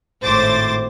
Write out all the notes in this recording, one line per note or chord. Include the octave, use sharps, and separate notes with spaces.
G#1 A2 C5 D6 A6